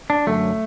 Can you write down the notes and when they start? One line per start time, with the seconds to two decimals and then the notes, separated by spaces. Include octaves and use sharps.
0.10 D4
0.27 F#2 D3 F#3 A3